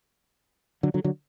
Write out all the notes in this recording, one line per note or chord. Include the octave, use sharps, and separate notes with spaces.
D3 F#3
D3 F#3
D3 F#3